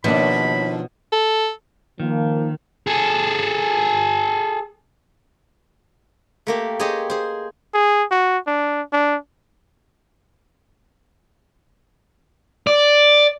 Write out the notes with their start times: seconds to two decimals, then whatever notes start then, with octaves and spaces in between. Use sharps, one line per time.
0.04 D#2 B2 F3 A#3 D4 B5
1.12 A4
2.00 D#3 F3 A#3
2.87 G#4 A4
6.47 A3 A#3 G4
6.79 G4 G#4 C5 C#5 D#5
7.10 G#4 C5
7.74 G#4
8.11 F#4
8.47 D4
8.93 D4
12.67 D5